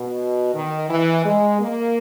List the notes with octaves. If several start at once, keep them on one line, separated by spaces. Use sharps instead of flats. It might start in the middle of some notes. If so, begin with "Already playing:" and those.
Already playing: B2
D#3
E3
G#3
A#3